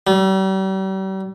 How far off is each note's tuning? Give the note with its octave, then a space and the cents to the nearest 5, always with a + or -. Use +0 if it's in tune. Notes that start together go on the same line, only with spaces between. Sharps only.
G3 -40